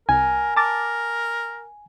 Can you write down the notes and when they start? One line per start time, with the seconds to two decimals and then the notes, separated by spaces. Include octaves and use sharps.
0.09 C2 A#4 G#5
0.56 A#4 A5 D6 A6